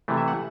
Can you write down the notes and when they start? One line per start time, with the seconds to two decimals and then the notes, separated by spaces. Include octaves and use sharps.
0.08 C3 E3 A3
0.17 E5
0.28 F#5